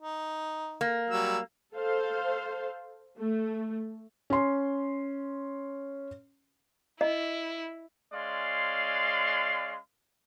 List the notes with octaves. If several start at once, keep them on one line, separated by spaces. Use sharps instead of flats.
D#4
A#3
F#3 G3 E6
A4 C5 F5
A3
C#4 C6
E4 D#5
G#3 C#4 D5 F5 C6